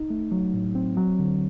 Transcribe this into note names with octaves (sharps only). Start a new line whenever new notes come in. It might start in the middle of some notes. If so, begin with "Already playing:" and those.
Already playing: D#4
A3
F#3
A2
C4
F#3
D3